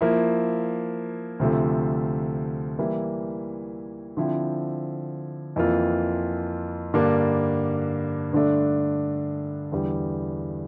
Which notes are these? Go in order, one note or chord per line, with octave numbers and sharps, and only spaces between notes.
F3 A#3 E4
D2 C3 F3 A3
E3 G3 A#3 E4
D3 F3 C4 E4
F2 E3 A#3 F4
G2 D3 G3 A#3 D4
G2 D3 A3 D4
E2 D3 G3